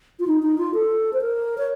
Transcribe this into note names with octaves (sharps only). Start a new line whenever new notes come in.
F4
D#4
D#4
F4
A4
C5
A#4
C#5